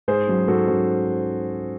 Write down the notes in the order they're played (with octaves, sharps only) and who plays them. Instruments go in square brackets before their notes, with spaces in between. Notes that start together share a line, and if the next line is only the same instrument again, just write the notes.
[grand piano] G#2 G#4 C5
F#3 C#4
G#2 F#4 A4
F#3 C#4